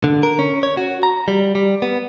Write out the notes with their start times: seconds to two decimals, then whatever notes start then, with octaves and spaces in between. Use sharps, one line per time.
0.04 D3
0.23 A#4
0.39 C#4
0.63 C#5
0.77 F#4
1.03 A#5
1.28 G3
1.55 G3
1.82 B3